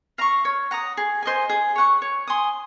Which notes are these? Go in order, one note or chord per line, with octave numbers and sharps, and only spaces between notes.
F5 A#5 C#6
C#5
F#5 A#5 D#6
G#4
C5 D#5 G#5
G#4
C#5 F#5 C#6
C#5
G#5 C6 D#6